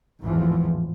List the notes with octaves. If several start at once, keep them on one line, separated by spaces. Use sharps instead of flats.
G#1 E2 A2 E3 F3